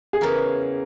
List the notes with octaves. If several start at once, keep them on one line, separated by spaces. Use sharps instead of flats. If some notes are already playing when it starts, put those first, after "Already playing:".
G#4
E2 C#3 E3 A#4